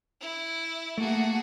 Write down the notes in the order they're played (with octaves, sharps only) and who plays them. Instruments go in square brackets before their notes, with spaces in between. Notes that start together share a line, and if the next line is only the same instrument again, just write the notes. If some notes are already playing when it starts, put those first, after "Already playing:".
[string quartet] E4
[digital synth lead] A3 [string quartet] A#3 F#4 G#4